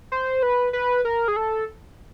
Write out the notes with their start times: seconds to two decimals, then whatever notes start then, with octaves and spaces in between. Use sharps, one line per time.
0.12 C5
0.43 B4
0.73 B4
1.05 A#4
1.28 G#4
1.36 A4